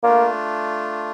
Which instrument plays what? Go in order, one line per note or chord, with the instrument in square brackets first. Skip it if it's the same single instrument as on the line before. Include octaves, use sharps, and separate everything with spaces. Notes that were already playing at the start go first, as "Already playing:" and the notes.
[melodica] A3 D4 F4 [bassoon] A#3